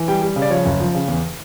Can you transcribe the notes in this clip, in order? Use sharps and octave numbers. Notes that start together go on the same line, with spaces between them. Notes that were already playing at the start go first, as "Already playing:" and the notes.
Already playing: E3
G3 G5
G3
C#3
D5
F3 C#5
F#1
F3
C#3
E2